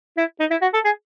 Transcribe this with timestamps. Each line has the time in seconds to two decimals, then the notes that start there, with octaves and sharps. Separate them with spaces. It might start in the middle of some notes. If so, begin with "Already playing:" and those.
0.17 E4
0.39 D#4
0.51 E4
0.62 F#4
0.73 A4
0.84 G#4